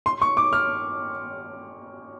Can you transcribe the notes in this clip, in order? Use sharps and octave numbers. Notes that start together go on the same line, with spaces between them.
C6
C#6
D6
F6